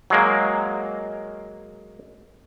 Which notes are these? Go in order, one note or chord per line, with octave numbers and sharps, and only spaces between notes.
F#3 G#3 A#3